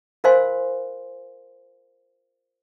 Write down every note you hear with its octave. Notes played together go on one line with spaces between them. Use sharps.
F4 A#4 C5 F5 G#5 C6